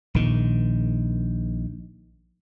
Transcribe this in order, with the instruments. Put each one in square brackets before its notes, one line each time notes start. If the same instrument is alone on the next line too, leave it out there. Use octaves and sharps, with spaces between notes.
[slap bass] A#1 D#3